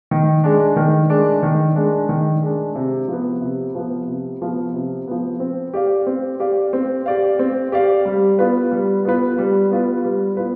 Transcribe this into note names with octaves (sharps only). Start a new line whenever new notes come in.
D#3
G#3 D4
D#3
G#3 D4
D#3
G#3 D4
D#3
G#3 D4
C3
F3 B3
C3
F3 B3
C3
F3 B3
C3
F3 B3
C4
G4 D5 F5
C4
G4 D5 F5
C4
G4 D5 F5
C4
G4 D5 F5
G3
B3 F4 B4
G3
B3 F4 B4
G3
B3 F4 B4
G3
B3 F4 B4